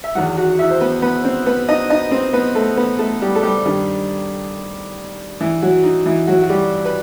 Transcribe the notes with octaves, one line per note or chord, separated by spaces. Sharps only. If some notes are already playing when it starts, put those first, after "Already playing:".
E5
E2 D#3 F#3 F#4 F#5
F#4 F#5
E4 E5
C5
B3 B4
B3 B4
C4 C5
B3 B4
D#4 D#5
D#4 D#5
C4 C5
B3 B4
A3 A4
B3 B4
A3 A4
G3 G4
A4
G3 G4
G2 D#3 G3
E3 E4
F#3 F#4
D#4
E3 E4
F#3 F#4
F#4
G3 G4
B4